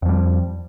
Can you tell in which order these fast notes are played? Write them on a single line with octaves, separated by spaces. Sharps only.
F2 F3 G3